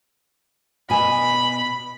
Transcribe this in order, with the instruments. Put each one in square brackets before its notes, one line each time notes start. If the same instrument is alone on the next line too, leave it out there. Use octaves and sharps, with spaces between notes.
[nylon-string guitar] B2 G#5 [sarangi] B5